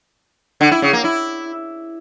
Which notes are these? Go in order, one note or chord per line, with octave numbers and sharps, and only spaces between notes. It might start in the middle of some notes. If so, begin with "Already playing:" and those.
D3
E4
C#3
A#3
E4